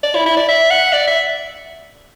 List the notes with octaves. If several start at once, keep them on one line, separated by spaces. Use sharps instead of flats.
D5
E4
E4
D5
E5
F#5
D5
E5